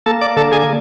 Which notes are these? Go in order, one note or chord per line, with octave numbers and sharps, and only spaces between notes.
A#3 A4 A5
D5 D6
D3 A4 A5
G#4 G#5